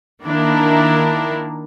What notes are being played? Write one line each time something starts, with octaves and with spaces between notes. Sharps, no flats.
D#3 A#3 D4 E4 A#4